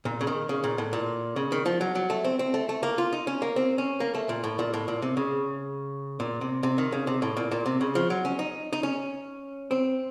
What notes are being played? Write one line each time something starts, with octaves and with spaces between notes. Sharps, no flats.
A#2
C#3
D#3
C#3
A#2
A2
A#2
C#3
D#3
F3
F#3
F#3
A3
C4
C4
A3
A3
A#3
F4
D#4
C#4
A#3
C4
C#4
A#3
A3
A#2
A2
A#2
A2
A#2
C3
C#3
A#2
C3
C3
D#3
C#3
C3
A2
A#2
A#2
C3
C#3
F3
F#3
C#4
D#4
D#4
C#4
C4